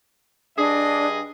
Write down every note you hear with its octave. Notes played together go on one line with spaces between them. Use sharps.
G2 D4 G#4 D#5